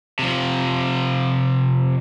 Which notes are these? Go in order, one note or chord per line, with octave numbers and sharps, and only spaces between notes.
C3 F3